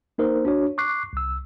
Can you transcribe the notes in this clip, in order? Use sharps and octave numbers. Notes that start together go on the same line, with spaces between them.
A#3 D#4 A#4 C5
D4 F#4 C#5
C#6 D6 F#6 C7
C2 E6